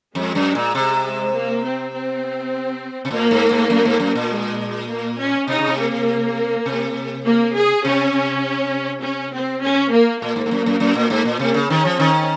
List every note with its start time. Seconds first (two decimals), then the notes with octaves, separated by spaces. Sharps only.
0.15 F2 G#3
0.35 F#2
0.55 A#2
0.75 C3
1.33 A#3
1.63 C4
1.93 C4
3.05 C3
3.11 A#2 A#3
3.31 G#2
3.51 G#2
3.70 F#2
3.85 G#2
4.00 F#2
4.15 A#2
4.30 G#3
4.89 A#3
5.18 C#4
5.48 C3 D#4
5.59 C#3
5.67 C3
5.77 A#3
6.66 C3
7.26 A#3
7.55 G#4
7.85 C3 C#4
9.03 C#4
9.33 C4
9.63 C#4
9.92 A#3
10.21 A#2 A#3
10.36 G#2
10.46 G#2
10.51 F#2
10.66 F#2
10.80 F#2
10.95 A#2
11.10 G#2
11.25 A#2
11.39 C3 A#3
11.54 C#3
11.69 D#3 C#4
11.85 F3
11.99 D#3 C#4